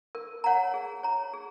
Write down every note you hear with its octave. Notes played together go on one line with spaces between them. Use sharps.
A#4
C#5 F#5 A#5
G#4
C#5 A#5
G#4